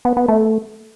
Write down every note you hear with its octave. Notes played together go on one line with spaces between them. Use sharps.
B3
B3
A3